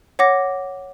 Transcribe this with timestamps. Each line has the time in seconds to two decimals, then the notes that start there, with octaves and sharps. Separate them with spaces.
0.19 C#5 F#5 D6 A#6